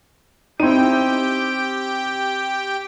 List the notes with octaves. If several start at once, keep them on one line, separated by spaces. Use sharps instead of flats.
C4 D#4 E4 G4 G5 D#7